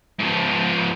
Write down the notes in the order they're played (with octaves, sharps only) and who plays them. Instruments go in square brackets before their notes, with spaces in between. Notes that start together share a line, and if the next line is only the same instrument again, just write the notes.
[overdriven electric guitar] G#2 F3